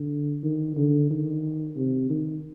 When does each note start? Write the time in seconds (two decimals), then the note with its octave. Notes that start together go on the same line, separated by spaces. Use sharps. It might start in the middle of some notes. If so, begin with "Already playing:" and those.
Already playing: D3
0.43 D#3
0.77 D3
1.10 D#3
1.77 C3
2.10 D#3